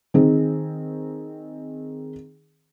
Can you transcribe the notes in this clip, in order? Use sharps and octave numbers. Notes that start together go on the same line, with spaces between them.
D#3 C4 G#4